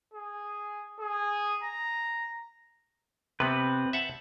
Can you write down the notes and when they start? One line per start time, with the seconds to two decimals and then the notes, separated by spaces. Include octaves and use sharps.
0.14 G#4
1.00 G#4
1.64 A#5
3.40 C3 B3 C4 B4
3.93 E5 F#5 A5